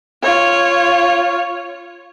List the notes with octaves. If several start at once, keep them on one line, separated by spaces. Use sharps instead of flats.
F4 C#5